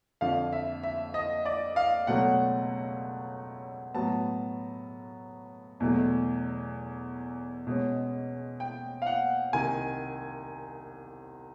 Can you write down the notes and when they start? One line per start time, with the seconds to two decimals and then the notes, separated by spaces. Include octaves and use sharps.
0.21 F2 D3 F3 F5
0.53 E5
0.83 E5
1.14 D#5
1.46 D5
1.76 F5
2.07 C#2 B2 F#3 A3 C#4 F#5
3.94 A2 F#3 B3 A5
5.80 E2 B2 F#3 A3
7.67 B2 G#3 C#4
8.60 G5
9.02 F5
9.06 F#5
9.53 C2 C3 D#3 G#5